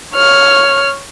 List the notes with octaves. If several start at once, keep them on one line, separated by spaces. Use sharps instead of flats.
C#5 F6